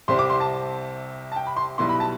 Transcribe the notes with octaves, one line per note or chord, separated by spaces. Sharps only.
C2 C3 G3 C4 C6
D6
C6
A5
A5
G5
B5
C6
B1 B2 G3 B3 E4 C6
B5
A5